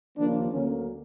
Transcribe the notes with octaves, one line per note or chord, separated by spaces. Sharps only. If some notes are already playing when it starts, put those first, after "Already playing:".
D#2 C#3 F3 A#3 D4
D2 D3 F#3 A#3 C#4